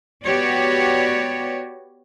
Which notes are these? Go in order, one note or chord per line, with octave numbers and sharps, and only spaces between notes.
B3 F#4 G4 C#5 D5